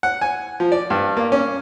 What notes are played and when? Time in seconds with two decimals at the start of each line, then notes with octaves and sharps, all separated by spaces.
0.03 F#5
0.21 G#5
0.60 F3
0.72 D5
0.90 G2
1.17 A#3
1.32 C#4